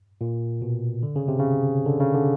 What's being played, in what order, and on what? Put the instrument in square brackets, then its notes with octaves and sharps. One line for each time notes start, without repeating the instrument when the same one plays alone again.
[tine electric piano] A#2
B2
D3
C#3
C3
C#3
D3
C#3
D3